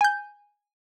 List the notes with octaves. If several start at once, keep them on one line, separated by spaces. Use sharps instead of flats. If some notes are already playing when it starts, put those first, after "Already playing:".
G#5 G6